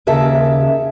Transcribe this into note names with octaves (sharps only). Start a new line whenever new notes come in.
D#2 C#3 A#4 E5 A5